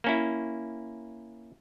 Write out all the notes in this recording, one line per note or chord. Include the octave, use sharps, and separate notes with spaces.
A#3 C#4 E4